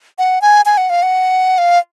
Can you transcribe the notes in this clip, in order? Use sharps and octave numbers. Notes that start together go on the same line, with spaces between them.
F#5
G#5
G#5
F#5
F5
F#5
F5